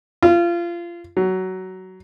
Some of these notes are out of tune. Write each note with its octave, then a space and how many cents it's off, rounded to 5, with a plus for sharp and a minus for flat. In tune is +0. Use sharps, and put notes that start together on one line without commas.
F4 -25
F#3 +15